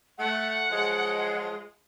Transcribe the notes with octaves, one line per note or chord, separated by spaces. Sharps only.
A3 F#5
F3 F#3 G#3